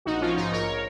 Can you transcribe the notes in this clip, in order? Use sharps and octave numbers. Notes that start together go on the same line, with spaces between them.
A#1 D#4 F#4
F3 C#4 F4
G#2 D#4
A#1 A#4 C#5